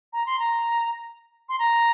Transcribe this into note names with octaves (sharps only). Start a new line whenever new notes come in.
A#5
C6
A#5
C6
A#5